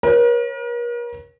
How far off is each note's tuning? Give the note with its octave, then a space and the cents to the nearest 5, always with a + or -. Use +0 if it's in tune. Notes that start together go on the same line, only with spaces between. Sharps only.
A#4 +40 C#5 -30